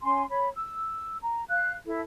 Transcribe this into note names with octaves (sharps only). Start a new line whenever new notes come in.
C#4 G#5 C6
C#5 B5
E6
A#5
F5 F#6
E4 A4